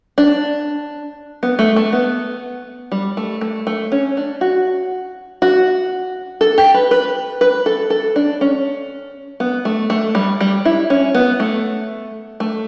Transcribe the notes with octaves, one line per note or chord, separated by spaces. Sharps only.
D4
B3
A3
A3
B3
G3
A3
A3
A3
C#4
D4
F#4
F#4
A4
G4
B4
B4
B4
A4
A4
D4
C#4
B3
A3
A3
G3
G3
E4
C#4
B3
A3
A3